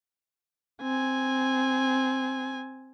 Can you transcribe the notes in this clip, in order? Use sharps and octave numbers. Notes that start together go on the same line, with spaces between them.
C4 G#5